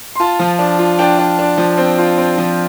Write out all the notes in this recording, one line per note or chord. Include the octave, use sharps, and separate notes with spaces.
C6
F4 A5
F3
D4
F4
D4 G5
D4
D4
F3
C4
F4
C4
F3